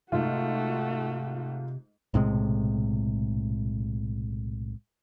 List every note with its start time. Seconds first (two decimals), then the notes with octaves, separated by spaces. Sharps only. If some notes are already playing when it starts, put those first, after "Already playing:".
0.12 G#2 C3 A3 F4 F#4
2.14 B1 A2 C3 G#3